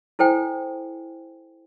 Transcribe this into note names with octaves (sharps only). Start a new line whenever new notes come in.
E4 A4 C5 G5 G#5